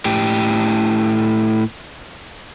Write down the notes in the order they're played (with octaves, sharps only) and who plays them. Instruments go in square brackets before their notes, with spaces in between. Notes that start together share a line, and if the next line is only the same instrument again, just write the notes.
[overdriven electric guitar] A2 G4